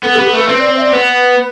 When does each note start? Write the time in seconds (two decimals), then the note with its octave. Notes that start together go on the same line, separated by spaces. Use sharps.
0.03 B3 A4
0.15 B3 G4
0.26 A4
0.34 A3 B4
0.48 C4 B4
0.60 D5
0.71 C5
0.77 E5
0.82 D5
0.93 B3 B4